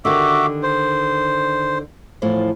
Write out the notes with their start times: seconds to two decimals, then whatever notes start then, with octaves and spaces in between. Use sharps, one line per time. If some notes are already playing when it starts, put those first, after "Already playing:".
0.05 D3 D#3 F#4 G4 E5 D6
0.63 C5
2.22 E2 A2 F3